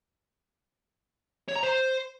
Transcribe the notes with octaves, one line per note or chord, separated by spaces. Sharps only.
C#5
A#5
C5